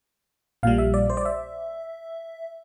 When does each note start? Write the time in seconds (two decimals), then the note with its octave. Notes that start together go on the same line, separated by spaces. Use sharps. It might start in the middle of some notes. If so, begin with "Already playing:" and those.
0.63 A#1 A#2 G3 F5
0.78 E5
0.94 D5
1.10 C5
1.17 D5
1.25 E5